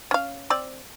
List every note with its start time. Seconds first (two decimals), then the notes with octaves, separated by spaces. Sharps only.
0.11 C#4 F5
0.50 C4 D5